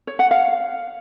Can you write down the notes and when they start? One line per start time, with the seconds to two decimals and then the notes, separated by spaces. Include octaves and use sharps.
0.07 C#5
0.19 F#5
0.31 F5